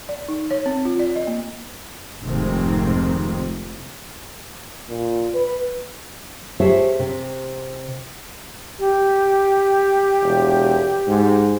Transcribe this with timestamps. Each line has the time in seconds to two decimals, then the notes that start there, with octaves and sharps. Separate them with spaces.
0.09 D5
0.29 D#4
0.51 C#5
0.66 C4
0.85 F4
1.00 D5
1.16 D#5
1.27 A#3
2.22 F1 F2 G#2 C3 D#3 C4
4.89 A#2
5.34 B4
6.60 G4 G#4 C5 C#5 E5 A5
6.99 C3
8.79 G4
10.23 E1
11.08 G#2